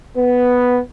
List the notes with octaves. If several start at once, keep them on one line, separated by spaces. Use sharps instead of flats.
B3